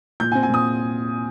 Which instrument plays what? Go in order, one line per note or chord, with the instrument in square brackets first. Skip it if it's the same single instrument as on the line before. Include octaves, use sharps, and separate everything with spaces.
[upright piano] A#2 G6
G#5
C4
G#5
A#2 D#6